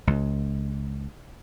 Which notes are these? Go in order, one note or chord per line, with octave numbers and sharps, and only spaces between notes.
C#2